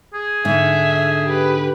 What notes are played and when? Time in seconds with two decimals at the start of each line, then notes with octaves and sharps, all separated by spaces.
0.14 G#4
0.45 G#2 D3 D#4 E5
1.25 G4 B4